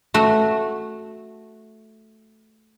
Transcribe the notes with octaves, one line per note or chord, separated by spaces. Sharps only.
A3 F#4